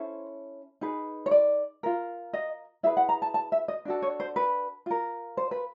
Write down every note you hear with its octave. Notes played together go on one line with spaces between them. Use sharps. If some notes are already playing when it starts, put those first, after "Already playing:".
Already playing: C#4 E4 A4 C5
D#4 G#4 B4
C#5
D5
F4 A#4
D#5
E4 G#4 B4 E5
F#5
A#5
A5
A5
E5
D#5
D4 F#4 A4
C#5
C5
B4
F4 A#4
C5
B4